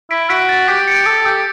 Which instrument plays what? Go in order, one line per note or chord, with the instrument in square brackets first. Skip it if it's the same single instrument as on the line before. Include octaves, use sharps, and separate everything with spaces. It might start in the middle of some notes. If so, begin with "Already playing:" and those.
[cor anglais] E4 [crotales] B6 D7
[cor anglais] F#4 [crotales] B6 D7
[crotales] A6
[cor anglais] G4 [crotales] B6
[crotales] A6 C#7
[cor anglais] A4 [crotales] A6
[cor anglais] G4 [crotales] G6